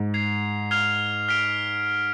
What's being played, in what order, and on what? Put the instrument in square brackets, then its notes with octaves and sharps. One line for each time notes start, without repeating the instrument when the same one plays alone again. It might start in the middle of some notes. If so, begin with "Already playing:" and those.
Already playing: [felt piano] G#2
[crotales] G#6 C7 F7
F6 G#6 C7 F7
F6 B6 D7 F7